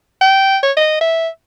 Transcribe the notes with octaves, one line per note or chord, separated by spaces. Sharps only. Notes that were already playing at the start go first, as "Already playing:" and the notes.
G5
C#5
D#5
E5